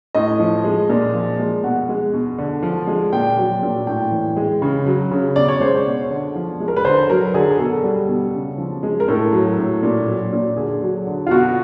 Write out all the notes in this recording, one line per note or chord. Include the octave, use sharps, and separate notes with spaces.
A2 D#5
F3
G#3
A#2
F3
G#3
B2 F#5
G#3
B2
D3
F3
G#3
A#2 G5
F#3
A#2
A2 G5
E3
G#3
C#3
F#3
C#3
B2 D5
C#5
G#3 C5
C#5
B2
D3
F3
G#3
A#4
B4
D3 C5
F#3 A#4
D3 G#4
B2 A4
G3
B2
C#3
F3
G#3
A#4
A2 A4
F#3
A2
A#2
F#3
A#2
D3 G#4
F#3
D3
F4
B2 F#4